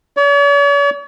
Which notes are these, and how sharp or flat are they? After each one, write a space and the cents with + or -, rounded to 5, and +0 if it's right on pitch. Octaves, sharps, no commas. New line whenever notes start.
C#5 +45